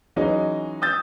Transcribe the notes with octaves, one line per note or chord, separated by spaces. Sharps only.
E3 F#3 G#3 C#4 D#4
D#6 E6 G6 A6